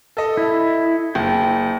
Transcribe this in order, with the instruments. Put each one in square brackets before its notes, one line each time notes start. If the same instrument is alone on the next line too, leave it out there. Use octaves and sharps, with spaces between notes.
[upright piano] A4 D#5
[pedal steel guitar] E4
[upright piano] F#1 [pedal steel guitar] G5